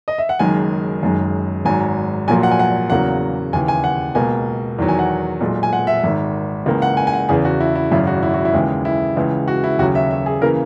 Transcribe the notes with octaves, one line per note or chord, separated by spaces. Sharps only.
D#5
E5
F#5
F#1 F#2 D#3 G#3 G#5
F#1 F#2 D#3 G#3
G#1 G#2 F#3 G#5
A#1 A#2 F#3 A#3 G#5
F#5
G#5
F#5
E2 C#3 F#3 A#3 F#5
D#2 C#3 E3 G#5
G#5
F#5
C#2 B2 A#3 G#5
E2 D#3 F#3
G#5
F#5
B1 A#2 G#3
G#5
F#5
E5
G#1 G#2 D#3
C#2 C#3 E3 A#3
F#5
G#5
G#5
F#5
E2 C#3 E3 G#4
F#4
E4
E4
G#1 F#2 C#3 E4
F#4
E4
F#4
E4
D#2 C#3 E3 G#3
E4
C#2 C#3 E3
F#4
E4
D#2 C#3 F#3 F#4
E5
E5
G#4
C#3 E3 A#3 A#4